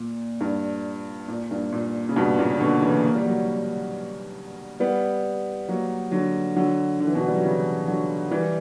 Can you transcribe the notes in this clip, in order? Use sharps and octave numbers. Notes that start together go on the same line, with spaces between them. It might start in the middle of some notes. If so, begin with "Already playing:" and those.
Already playing: A#2
G2
A#2
G2
A#2
C#3
G2 B2
A#2 C#3
B2 D3
C#3 E3
A#3
G3
F#3 A#3
G3 B3
F#3 A#3
D3 F#3
D3 F#3
D3
E3
B2 D3
G3
F#3
C#3 E3
D3 F#3
E3 G3